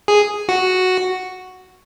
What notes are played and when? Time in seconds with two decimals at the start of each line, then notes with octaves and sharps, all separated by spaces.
0.08 G#4
0.49 F#4